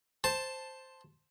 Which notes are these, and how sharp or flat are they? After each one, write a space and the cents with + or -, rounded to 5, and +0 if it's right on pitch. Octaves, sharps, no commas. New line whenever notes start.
C5 +0 A5 +0